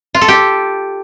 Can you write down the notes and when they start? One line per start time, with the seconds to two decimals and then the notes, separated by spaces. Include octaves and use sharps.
0.14 F4
0.21 A4
0.28 G4